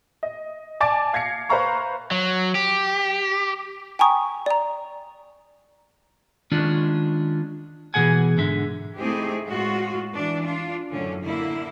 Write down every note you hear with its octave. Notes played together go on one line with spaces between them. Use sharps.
D#5
D5 G#5 A5 D6 A6 D7
F5 G#6 A#6 C7 C#7
B4 C5 F5 A#5 C#6
F#3
G4
G5 G#5 A#5 C#6 D#6
D5 A#5
D#3 G#3 C#4 D4 F4
B2 E3 F3 G#4 F#5 G#5
G#2 D3 E5
A3 C4 D#4 E4 G4 G#4
A2 G#3 F4 F#4
E3 D4
D4 F4
F#2 A2 D3 C#4
D3 A#3 E4